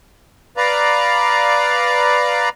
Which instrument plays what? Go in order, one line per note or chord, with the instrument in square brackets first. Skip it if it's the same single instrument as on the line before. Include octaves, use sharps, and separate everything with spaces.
[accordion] B4 D5 F5 A#5